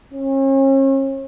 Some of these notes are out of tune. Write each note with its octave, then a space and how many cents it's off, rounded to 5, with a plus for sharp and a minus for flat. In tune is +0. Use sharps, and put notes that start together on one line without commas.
C#4 -40